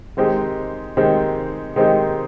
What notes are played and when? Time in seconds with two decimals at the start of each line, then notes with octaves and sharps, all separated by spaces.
0.17 D#3 G#3 C4 D#4 G4
0.97 D#3 G#3 C4 D#4 G4
1.76 D#3 G#3 C4 D#4 G4